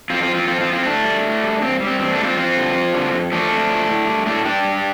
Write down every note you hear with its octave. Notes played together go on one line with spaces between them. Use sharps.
F2 C4 F4
C4 F4
F3
C4 F4
F2 C4 F4
C4 F4
F3
C4 F4
A2 A3 D4
G3
A2
G3
G2 C4
G3
C4
G2 C4
A3 D4
G3
C4 F4
F2 C4 F4
D3 G3
F2
D3 G3
F2
F3 A3 D4
F2
F3
A2
G3
A2 A3 D4
G3 D4 G4
G2